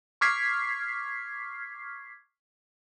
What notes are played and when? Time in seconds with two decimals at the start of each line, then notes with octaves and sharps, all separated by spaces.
0.21 C#6 D6 F6 G#6 B6 C7